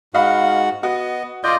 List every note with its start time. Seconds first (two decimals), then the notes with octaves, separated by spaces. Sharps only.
0.14 G#2 F#4 D#5 F5 F#5 B5
0.83 B3 F#4 D#5
1.44 F4 D5 D#5 C6 G6